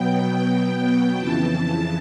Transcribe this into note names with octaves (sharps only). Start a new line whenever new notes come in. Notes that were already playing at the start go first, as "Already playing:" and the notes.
Already playing: B2 F#3 B3 G5
G5
F2 C#3 E3 A5